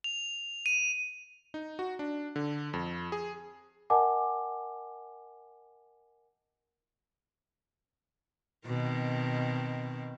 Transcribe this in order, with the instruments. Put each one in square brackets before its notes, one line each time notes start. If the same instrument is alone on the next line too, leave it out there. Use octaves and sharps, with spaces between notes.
[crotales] F7
D#7
[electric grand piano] D#4
F#4
D4
D3
F2
G#4
[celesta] A#4 D#5 F#5 G#5 A5 D6
[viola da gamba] B2 D#3 C4